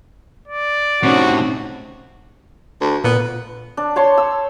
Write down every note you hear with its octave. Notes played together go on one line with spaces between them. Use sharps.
D5
A2 C3 C4 C#4 D#4 F#4
D2
A#2 B3
D4
C5 C#5 A5 C6
E6